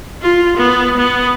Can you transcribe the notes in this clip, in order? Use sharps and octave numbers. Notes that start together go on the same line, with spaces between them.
F4
B3
B3